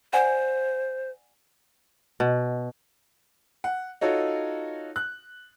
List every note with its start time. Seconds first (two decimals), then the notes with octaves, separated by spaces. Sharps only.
0.13 C5 D5 F#5 G#5
2.20 B2
3.64 F#5
4.01 D#4 F4 F#4 A4 C#5
4.96 F#6